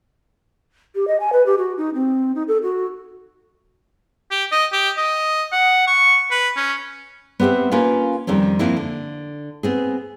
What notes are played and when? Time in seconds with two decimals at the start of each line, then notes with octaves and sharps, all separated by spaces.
0.95 G4
1.07 D#5
1.20 G#5
1.33 B4
1.46 G4
1.58 F#4
1.78 D#4
1.94 C4
2.35 D#4
2.48 A4
2.63 F#4
4.31 G4
4.52 D#5
4.73 G4
4.97 D#5
5.52 F#5
5.87 C#6
6.31 B4
6.56 C#4
7.40 B3 C4 G4 C5 E5
7.71 A#3 C#4 F4 A#4 B4 F5
8.27 F2 D#3 G3 C4 C#4
8.59 F2 A#3 C4 E4
8.77 D3
9.63 B3 C4 G#4